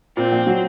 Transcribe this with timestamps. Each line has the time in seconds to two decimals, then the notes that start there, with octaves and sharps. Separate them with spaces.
0.17 A#2 C4
0.32 A#1
0.47 F#3